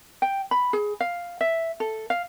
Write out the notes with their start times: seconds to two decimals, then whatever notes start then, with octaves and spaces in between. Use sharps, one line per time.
0.22 G5
0.51 B5
0.73 G#4
1.00 F5
1.41 E5
1.80 A4
2.10 F5